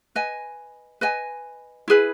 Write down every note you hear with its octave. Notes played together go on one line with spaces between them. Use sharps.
B4 D#5 G#5
B4 D#5 G#5
E4 G#4 B4